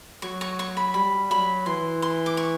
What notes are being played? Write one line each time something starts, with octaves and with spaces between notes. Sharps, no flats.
F#3 C#6
C#6
C#6
B5
G3 B5
F#3 B5
E3 C6
C6
D6
C#6